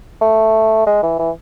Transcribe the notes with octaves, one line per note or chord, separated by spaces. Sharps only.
A3
G#3
E3
E3